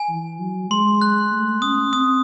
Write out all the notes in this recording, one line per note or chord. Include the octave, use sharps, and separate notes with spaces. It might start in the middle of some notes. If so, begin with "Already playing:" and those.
Already playing: G#5
E3
F#3
G#3 C6
F#6
A3
C#4 D#6
C4 D#6